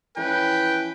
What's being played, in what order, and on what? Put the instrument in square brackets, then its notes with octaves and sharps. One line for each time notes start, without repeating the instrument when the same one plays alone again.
[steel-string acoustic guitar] E3 F3 C#4 [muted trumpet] B4 [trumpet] G5